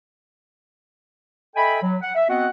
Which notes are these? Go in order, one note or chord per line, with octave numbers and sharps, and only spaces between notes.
A4 D#5 E5 G5 G#5 B5
F#3
F#5
E5
B3 C4 F#4 D#5 F#5